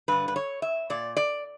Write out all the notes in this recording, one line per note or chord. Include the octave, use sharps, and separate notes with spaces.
G2 D3 B4
B4
C#5
E5
A#2 D5
D5